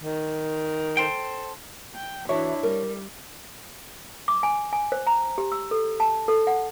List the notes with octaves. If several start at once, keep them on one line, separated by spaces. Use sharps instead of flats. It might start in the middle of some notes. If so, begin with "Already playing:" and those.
D#3
A4 C5 G5
G5
E3 D4 E4 F#4 C#5 E5
G3 A#4
D6
G#5
G#5
C5
A#5
G4
E6
A4
A5
A4
F#5